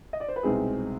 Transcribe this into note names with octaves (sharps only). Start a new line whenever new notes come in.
D#5
D5
C5
B4
C2 B2 G#3 C4 D#4 G#4